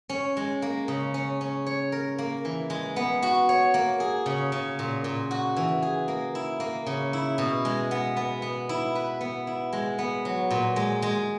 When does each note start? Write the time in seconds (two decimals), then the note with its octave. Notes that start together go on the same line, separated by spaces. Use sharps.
0.09 C#4
0.37 G#3
0.62 A#3
0.88 C#3
1.14 C#4
1.41 C#4
1.66 C#5
1.92 A#4
2.19 A#3
2.45 E3
2.70 G#3
2.96 B3
3.23 F#4
3.49 C#5
3.74 A#3
4.00 G#4
4.26 C#3
4.52 C#3
4.79 A#2
5.04 A#2
5.31 F#4
5.57 E3
5.82 G#4
6.08 A#3
6.35 E4
6.60 A#3
6.87 C#3
7.13 E4
7.38 B2
7.65 G#3
7.91 B3
8.17 B3
8.42 B3
8.69 E4
8.95 B4
9.21 B3
9.47 E4
9.73 G#3
9.99 B3
10.25 F#3
10.51 A#2
10.76 G#3
11.02 G#3